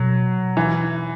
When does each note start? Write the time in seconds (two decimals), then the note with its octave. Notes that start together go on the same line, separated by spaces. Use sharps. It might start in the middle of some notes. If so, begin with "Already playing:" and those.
Already playing: B2 F#3
0.57 E3